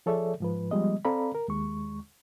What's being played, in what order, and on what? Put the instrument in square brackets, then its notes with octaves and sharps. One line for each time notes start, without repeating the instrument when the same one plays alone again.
[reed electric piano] F3 G#4 A4 C#5 D5 E5
G#2 F3 B4
F3 G3 G#3 B3 D#5
C4 A4 D5 F5 A#5 B5
A#4
D#2 G#3 C#6